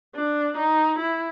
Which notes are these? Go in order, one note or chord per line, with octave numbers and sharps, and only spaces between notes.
D4
D#4
E4